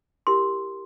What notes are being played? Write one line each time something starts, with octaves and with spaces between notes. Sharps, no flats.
E4 G4 A#4 C6